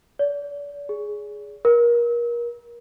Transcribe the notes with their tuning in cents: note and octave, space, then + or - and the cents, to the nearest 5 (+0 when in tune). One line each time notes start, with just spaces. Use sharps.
D5 -35
G#4 +5
A#4 +30